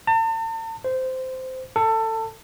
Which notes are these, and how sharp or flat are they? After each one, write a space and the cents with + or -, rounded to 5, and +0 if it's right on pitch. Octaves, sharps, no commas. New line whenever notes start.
A5 +40
C5 -15
A4 +25